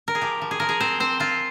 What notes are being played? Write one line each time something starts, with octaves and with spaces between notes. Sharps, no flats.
A#4
G#4
F3 G4
F3
G#4
F3 A#4
G#4
C4 C5
C4 C5
C4 F4